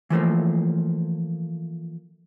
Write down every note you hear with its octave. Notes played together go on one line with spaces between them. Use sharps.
E3 F3 A3 A#3